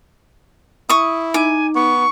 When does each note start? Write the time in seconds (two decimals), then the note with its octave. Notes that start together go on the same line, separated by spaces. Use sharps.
0.89 E4 C#6 D#6
1.34 D#4 G#5 D6
1.75 B3 C#6